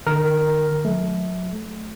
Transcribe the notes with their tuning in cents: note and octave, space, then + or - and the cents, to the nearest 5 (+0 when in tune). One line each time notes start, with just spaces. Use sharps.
D#3 -45 A#4 +0
F#3 -35 A3 -25